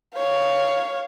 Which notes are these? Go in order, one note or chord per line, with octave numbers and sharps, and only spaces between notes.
C#5 F5